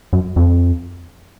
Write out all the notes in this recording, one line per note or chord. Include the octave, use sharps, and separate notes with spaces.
F#2
F2